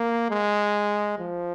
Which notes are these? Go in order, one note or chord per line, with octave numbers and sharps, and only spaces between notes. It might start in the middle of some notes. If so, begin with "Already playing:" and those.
Already playing: A#3
G#3
F3